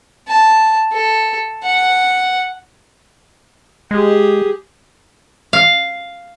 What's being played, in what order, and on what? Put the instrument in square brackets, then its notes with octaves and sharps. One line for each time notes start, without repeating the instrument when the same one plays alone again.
[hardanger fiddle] A5
A4
F#5
[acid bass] G#3 [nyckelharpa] G4 G#4
[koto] F5